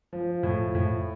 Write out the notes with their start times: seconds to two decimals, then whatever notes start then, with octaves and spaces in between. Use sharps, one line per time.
0.13 F3
0.43 A2
0.75 A2